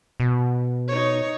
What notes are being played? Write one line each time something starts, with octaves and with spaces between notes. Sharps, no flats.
B2
D#4 C#5